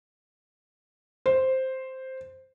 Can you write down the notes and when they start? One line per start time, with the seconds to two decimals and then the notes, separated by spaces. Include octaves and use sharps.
1.26 C5